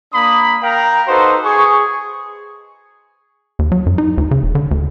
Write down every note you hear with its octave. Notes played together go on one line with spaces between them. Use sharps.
A#3 D4 B5 D#6
A#4 F5 G5 A#5
D#4 F#4 A4 B4 C5
G#4 C#6
D#2
F#3
F#2
D#4
D2
C#3
E1
D3
D2